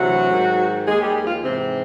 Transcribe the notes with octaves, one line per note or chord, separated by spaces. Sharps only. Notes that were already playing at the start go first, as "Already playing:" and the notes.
Already playing: D2 C3 E3 F#3 F#4
G#2 D#3
D#2 D#3 G#3 G#4
G3 G4
G#3 G#4
F3 F4
G#2 C3 E3 C4